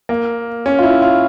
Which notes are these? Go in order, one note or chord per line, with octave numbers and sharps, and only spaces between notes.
A#3
C#4
F4
E4
F4